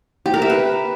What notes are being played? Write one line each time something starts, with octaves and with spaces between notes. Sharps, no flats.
G4
A#4
E5
B4